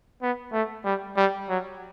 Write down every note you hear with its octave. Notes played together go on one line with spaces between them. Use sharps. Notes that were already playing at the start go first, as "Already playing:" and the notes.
B3
A3
G3
G3
F#3